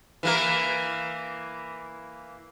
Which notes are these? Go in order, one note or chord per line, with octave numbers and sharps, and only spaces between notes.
E3 A#3 A#4